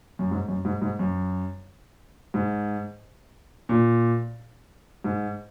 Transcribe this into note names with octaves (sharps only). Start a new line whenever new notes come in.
F#2
G#2
F#2
G#2
G#2
F#2
G#2
A#2
G#2